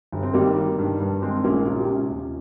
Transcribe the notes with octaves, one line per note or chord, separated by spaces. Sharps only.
G1
C4
D#3 G3 A#3
D#3
G2
G2
D#3 G#3 C4
A#1 A#3 C#4
C#2 F4
G4
C3 C#4 F4
D#2